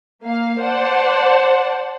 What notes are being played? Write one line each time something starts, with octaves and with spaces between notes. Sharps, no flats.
A#3 F5
C5 D5 F#5 A5